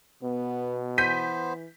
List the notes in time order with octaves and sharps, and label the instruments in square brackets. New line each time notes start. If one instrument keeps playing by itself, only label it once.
[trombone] B2 [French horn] B3
[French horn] E3 [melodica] B3 C5 [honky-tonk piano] G6 B6 D#7